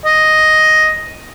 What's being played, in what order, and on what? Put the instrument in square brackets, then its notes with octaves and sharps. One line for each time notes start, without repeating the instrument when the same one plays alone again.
[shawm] D#5